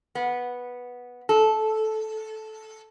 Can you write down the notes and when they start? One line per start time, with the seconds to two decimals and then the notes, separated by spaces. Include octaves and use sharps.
0.15 B3
1.29 A4